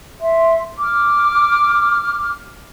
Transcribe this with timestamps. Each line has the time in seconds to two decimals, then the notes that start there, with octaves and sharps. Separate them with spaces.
0.21 E5 C6
0.78 D6 F6